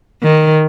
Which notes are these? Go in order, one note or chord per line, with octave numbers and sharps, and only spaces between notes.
D#3